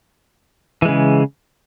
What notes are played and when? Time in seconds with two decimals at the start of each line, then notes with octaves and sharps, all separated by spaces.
0.82 E3
0.85 G#3
0.88 C#3